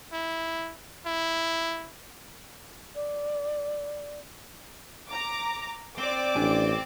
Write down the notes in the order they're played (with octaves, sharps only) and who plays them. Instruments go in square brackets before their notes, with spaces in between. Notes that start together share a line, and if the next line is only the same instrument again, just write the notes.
[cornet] E4
E4
[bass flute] D5
[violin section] A#5 D6
[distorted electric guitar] C4 [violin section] D5 D6
[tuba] A1 [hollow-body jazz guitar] D4 G#5